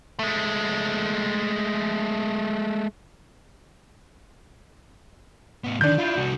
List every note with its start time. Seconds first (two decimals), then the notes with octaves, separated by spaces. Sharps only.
0.19 G#3 A3
5.64 A2 B3
5.81 D3 D#3 D4 G6
5.98 E4 F4
6.17 C2 F#4